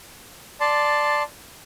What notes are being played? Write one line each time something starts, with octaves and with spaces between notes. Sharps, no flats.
D5 A5 C6